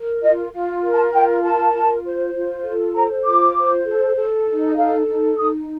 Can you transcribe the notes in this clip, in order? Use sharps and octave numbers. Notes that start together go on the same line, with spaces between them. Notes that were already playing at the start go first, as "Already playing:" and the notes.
Already playing: A#4
F4 D#5
F4
A#4
A5
F4 G5
A#4 A5
F4
C5
F4
A4
C5 A#5
F4 D6
C5
A4
A4
D#4
D#5
A4 F5
D#4
D#4 D#6